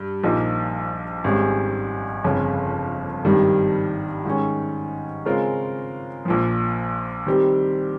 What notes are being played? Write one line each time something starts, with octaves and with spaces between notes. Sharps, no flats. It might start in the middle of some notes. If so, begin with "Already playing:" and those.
Already playing: G2
A#1 A#2 F3 A#3 D#4
G#1 G#2 G3 C#4 G#4
G1 F2 C#3
G#1 G2 D#3 G3
G#2 D#3 G#3 C#4
C#3 G#3 C4 F4 A#4
A#1 A#2 F3
D#3 G3 C4 G4